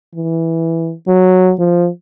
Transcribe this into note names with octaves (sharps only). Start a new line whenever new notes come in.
E3
F#3
F3